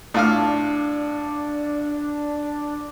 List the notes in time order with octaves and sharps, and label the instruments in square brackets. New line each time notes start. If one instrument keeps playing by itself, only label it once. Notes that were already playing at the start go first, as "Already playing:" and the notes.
[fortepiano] A2 F4 F6 [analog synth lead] D4